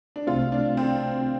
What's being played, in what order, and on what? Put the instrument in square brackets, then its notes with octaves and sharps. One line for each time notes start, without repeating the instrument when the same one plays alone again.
[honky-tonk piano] D4
[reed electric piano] C2 C3 A3 C4 [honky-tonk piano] F4
[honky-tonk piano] D4
C4